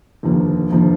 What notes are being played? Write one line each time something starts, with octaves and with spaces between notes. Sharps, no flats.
F1 D#2 D3 F3 A#3
F1 D#2 D3 F3 A#3